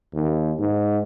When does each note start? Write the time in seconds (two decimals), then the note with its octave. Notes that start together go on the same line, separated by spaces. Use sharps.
0.13 D#2
0.59 G#2